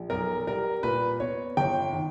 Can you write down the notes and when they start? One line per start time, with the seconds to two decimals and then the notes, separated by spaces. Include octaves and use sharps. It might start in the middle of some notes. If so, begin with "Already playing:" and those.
Already playing: A#1
0.10 B1 A#4
0.47 G3 A#4
0.83 A#2 B4
1.20 B3 C#5
1.57 G1 G5
1.93 D#3